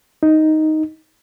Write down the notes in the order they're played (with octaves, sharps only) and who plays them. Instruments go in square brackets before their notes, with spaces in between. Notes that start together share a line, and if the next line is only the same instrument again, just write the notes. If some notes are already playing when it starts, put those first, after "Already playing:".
[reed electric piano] D#4